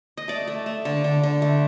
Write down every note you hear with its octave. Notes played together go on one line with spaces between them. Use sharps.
D#5
A3 D5
A3
A3
D3
D3
D3
A3